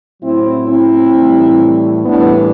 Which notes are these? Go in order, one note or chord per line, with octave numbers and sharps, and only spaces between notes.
A2 F#3 C4 E4
C4 E4
A2 E3 G3
A2 E3 G3 B3 D4